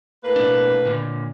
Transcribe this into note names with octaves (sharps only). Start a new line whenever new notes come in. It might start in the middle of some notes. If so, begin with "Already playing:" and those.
A2 A#3 B4
B2 D4
A#2 D3